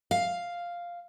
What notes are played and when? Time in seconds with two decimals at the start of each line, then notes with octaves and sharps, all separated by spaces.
0.11 F5